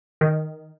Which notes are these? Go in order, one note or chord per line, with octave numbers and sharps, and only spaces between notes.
D#3